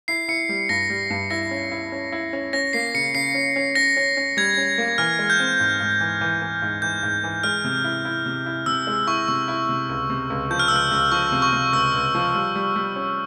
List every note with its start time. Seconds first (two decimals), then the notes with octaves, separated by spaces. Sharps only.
0.08 E4 C7
0.28 E4 C#7
0.49 G3
0.69 G2 A#6
0.90 G3
1.10 G2
1.30 E4 A#6
1.51 C#4
1.72 E4
1.92 C#4
2.12 E4
2.33 C#4
2.53 C#4 A#6
2.73 A#3 C7
2.94 C#3 C#7
3.15 C#3 C7
3.35 C#4
3.56 C#4
3.75 C#4 A#6
3.97 C#4
4.17 C#4
4.37 G3 G#6
4.57 C#4
4.78 A#3
4.98 E3 F6
5.19 G#3
5.30 G6
5.40 C4
5.60 G#2
5.80 G#2
6.01 E3
6.21 E3
6.42 E3
6.62 G#2
6.82 E3 G6
7.03 G#2
7.24 E3
7.43 G#3 F6
7.64 C3
7.84 E4
8.05 E4
8.26 C3
8.46 E4
8.66 C3 E6
8.87 G#3
9.07 E4 C#6
9.28 C3 C#6
9.48 E4
9.69 C3
9.89 C#2
10.10 C3
10.30 C#2
10.51 F3 G6
10.59 F6
10.68 C#2 E6
10.76 F6
10.91 C#2
11.12 F3 C#6
11.32 C3
11.42 C#6
11.53 C3
11.73 C#2 E6
11.94 C#2
12.15 F3
12.35 G3
12.56 G3
12.76 G3
12.96 C#4